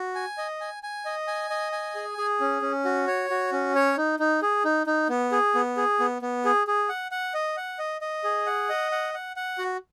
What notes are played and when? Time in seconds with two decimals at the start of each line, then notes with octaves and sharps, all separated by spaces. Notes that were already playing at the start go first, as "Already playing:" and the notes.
Already playing: F#4
0.15 G#5
0.38 D#5
0.61 G#5
0.83 G#5
1.05 D#5
1.28 G#5
1.50 D#5
1.72 G#5
1.95 G#4
2.18 G#4
2.40 C#4
2.62 C#4
2.85 F#4
3.07 C#5
3.30 F#4
3.52 C#4
3.75 C#5
3.97 D#4
4.19 D#4
4.42 G#4
4.65 D#4
4.87 D#4
5.09 B3
5.32 G#4
5.55 B3
5.77 G#4
6.00 B3
6.22 B3
6.45 G#4
6.67 G#4
6.89 F#5
7.11 F#5
7.34 D#5
7.57 F#5
7.79 D#5
8.01 D#5
8.24 G#4
8.46 F#5
8.69 D#5
8.92 F#5
9.14 F#5
9.36 F#5
9.58 F#4